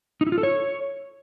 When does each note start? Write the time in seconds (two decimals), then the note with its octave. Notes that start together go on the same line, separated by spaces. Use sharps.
0.21 D#4
0.27 E4
0.32 F4
0.38 A4
0.43 C#5